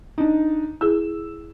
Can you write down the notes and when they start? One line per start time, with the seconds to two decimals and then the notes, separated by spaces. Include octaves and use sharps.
0.18 D4 D#4
0.81 E4 G#4 E6